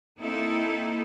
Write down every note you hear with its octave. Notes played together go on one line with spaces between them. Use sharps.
A#3 C4 D#4 E4 A4